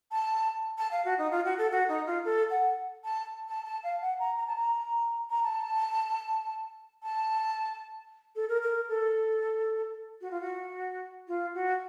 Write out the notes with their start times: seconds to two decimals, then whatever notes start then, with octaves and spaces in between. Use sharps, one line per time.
0.11 A5
0.77 A5
0.91 F5
1.04 F#4
1.18 D#4
1.31 F4
1.44 F#4
1.57 A4
1.71 F#4
1.88 D#4
2.06 F4
2.24 A4
2.50 F#5
3.04 A5
3.48 A5
3.65 A5
3.83 F5
4.01 F#5
4.19 A#5
4.36 A#5
4.46 A5
4.56 A#5
5.30 A#5
5.43 A5
7.02 A5
8.35 A4
8.48 A#4
8.61 A#4
8.88 A4
10.21 F#4
10.30 F4
10.40 F#4
11.27 F4
11.54 F#4